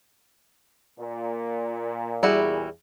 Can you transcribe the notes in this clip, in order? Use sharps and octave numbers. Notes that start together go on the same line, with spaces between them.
A#2
E2 G3 E4 F#4 G#4